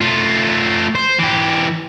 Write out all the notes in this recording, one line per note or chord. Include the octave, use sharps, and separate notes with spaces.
A3 F4
C5
E3 G4